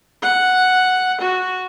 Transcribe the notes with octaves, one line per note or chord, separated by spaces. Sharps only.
F#5
F#4